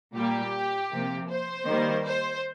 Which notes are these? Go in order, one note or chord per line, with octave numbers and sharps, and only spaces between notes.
A#2 G3 A#3 G4
C3 F3 A#3
C5
D#3 G3 A#3
C5